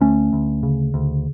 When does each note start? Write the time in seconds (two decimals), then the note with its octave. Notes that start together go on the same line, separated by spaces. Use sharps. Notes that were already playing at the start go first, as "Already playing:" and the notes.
0.01 D2 A3 C#4
0.33 D2
0.63 C#3
0.94 D2